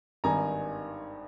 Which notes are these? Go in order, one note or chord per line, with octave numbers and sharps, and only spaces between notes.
G#1 G2 D#3 G#5 A#5